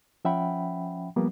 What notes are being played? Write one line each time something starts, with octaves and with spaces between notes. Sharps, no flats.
F3 C#4 E5 F#5 G5 B5
F3 G3 A#3 B3